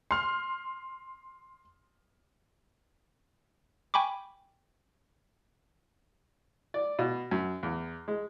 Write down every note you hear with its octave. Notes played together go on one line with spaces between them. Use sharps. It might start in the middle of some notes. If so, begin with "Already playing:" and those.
C6 F6
G5 G#5 B5 C#6 D6
D5
B2
F#2
E2
G#3